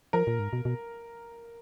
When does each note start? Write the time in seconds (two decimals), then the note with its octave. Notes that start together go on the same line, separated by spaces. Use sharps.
0.13 F3 A#4
0.27 A#2
0.39 G#2
0.53 B2
0.65 B2